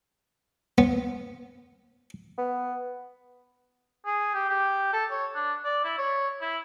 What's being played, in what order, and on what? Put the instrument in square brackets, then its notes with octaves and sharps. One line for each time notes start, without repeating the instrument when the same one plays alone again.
[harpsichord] B3
[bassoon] B3
[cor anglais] G#4
G4
G4
A4
C#5
D4
D5
E4
C#5
E4